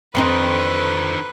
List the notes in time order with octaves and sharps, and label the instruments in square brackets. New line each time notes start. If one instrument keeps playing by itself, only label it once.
[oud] F2 C4 D#4 [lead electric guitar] D3 D#3 [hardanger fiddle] B4